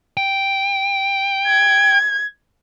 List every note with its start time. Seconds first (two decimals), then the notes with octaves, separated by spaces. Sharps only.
0.17 G5
1.47 G#6